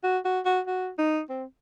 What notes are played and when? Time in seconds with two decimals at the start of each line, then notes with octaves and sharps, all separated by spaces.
0.03 F#4
0.25 F#4
0.45 F#4
0.67 F#4
0.98 D#4
1.30 C4